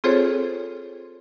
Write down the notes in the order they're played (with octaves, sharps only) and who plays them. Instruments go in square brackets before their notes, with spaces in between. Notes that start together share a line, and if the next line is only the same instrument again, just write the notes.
[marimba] C4 F4 G#4 A4 C5 C#5